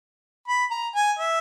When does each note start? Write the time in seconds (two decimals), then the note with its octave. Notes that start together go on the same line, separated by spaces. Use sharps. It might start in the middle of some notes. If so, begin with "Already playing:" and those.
0.48 B5
0.71 A#5
0.95 G#5
1.19 E5